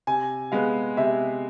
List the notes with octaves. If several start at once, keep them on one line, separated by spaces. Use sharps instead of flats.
C3 G#5
G#3 B3 F5
C3 E5